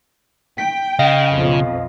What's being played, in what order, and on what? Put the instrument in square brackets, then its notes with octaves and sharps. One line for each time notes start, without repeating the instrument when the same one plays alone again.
[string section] G5 [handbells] B6
[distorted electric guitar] C#3 [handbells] D#5 F5
[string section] B1 F2